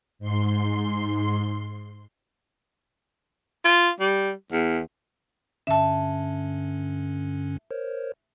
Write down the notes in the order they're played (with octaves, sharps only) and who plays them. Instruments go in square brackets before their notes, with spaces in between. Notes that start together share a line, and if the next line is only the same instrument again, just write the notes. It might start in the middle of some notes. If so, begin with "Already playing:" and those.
[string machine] G#2 C6
[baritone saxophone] F4
G3
E2
[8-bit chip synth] G2 D3 C#4 [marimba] E5 A5
[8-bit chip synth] A#4 C5 C#5